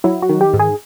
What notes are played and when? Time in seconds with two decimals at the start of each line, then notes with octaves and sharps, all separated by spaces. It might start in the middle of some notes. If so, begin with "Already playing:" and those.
0.04 F#3 E4
0.22 F#4
0.29 D#3
0.41 G4
0.54 G#2
0.59 G#4